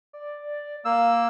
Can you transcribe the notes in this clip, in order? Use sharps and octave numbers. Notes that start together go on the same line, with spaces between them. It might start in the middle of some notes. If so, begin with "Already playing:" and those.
D5
A#3 F5 E6